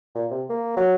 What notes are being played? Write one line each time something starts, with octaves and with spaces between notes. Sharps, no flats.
A#2
C3
A#3
F#3